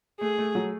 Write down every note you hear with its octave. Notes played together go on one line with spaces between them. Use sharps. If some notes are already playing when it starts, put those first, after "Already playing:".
A3 G#4
A3
F#3